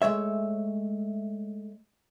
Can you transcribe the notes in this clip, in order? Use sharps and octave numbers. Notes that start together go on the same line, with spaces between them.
G#3 A3 C#5 E5